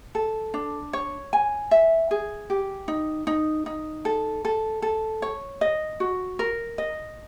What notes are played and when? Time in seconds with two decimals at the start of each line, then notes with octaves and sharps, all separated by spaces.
0.15 A4
0.54 D4
0.93 C#5
1.33 G#5
1.71 E5
2.11 G#4
2.50 G4
2.88 D#4
3.27 D#4
3.66 D#4
4.05 A4
4.45 A4
4.82 A4
5.22 C#5
5.61 D#5
6.00 F#4
6.39 A#4
6.78 D#5